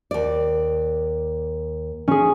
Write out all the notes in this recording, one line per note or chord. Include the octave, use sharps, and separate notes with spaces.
D#2 D5
C#4 G#4